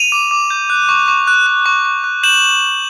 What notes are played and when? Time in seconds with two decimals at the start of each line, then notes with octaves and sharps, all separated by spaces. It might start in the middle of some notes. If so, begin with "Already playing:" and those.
Already playing: D#7 F7
0.12 D6
0.31 D6
0.50 G6
0.70 F#6
0.89 C#6
1.08 C#6
1.27 F#6
1.47 F#6
1.66 C#6
1.85 C#6
2.04 F#6
2.23 G6 E7 F#7